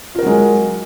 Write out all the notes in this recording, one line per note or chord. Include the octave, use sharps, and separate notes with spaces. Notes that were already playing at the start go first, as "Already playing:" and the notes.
F#3 G#3 F4 A#4